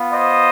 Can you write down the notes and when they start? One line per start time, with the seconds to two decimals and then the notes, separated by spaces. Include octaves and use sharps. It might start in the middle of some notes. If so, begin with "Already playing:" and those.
Already playing: B3 F4
0.12 C5 D#5